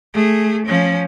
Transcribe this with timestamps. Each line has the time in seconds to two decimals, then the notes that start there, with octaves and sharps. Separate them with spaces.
0.14 A3 G#4
0.66 F3 C#4